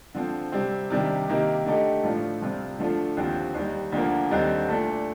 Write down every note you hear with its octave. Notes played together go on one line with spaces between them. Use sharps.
D3 F3 C4
C3 G3 C4
C3 D#3 G3 D4 G4
C3 D#3 A#3 D#4 G4
D3 A3 D#4 G4
A2 F3 A3 D4 F4
C2 C3 F3 C4 F4
D3 F3 A3 D4 F4
D#2 D3 F3 C4 G4
D#2 D#3 G3
D2 D3 F3 A#3
D#2 D3 G3 C4 D#4
A#2 A3 D4